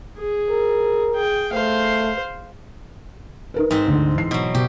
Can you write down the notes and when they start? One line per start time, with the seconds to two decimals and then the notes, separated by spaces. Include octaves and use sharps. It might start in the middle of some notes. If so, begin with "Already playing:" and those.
0.18 G#4
0.50 A#4
1.13 G#4 G5
1.53 A3 C5 F5
3.54 D#4 A#4 B4
3.71 G#2 C4
3.88 D2 D3
4.14 E3 C7
4.31 B2 F#3
4.55 B2 G4